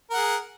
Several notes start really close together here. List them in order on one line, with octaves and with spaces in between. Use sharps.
A#4 F#5 G#4